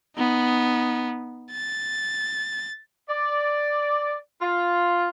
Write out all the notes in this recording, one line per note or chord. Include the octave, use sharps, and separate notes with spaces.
B3 D#4
A6
D5
F4